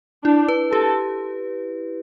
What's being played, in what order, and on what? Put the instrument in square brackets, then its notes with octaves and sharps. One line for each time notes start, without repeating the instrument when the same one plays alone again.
[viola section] D4 [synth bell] E4
[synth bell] B4
[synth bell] G4 [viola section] A4